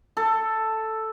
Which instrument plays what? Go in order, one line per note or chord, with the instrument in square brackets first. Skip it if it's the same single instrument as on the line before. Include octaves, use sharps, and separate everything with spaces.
[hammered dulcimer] A4